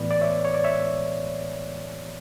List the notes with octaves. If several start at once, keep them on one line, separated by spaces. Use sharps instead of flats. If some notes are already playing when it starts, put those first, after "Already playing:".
Already playing: A2 E3 B3 B4 D5
D5
C#5 E5
C#5
D5
C#5 E5